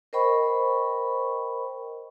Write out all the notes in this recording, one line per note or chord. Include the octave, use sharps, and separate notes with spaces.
A#4 C5 D#5 G5 B5 C#6